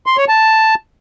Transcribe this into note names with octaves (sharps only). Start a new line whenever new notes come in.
C6
C#5
A5